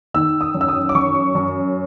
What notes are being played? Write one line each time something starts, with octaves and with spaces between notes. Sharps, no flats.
D#3 E6
D#6
F#2
E6
D#6
D6
F#2 C#6
F#2